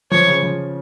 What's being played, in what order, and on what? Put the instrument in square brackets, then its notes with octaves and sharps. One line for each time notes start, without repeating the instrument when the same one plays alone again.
[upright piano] F3 [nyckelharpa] C#5
[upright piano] C#3
F3